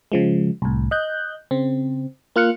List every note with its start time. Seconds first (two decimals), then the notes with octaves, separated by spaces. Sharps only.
0.12 C#3 F3 G#3
0.62 C2 A2
0.91 D#5 F#6 G6
1.51 C#3 C4
2.36 A#3 F4 F6 F#6 C#7